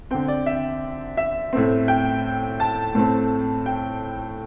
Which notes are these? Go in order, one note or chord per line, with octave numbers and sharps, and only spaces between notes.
D3 C4 G5
D5
E5
E5
A2 A3 C4
G5
A5
A2 A3 C4
G5